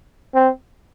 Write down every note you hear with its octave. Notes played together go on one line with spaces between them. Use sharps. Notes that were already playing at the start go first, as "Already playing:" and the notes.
C4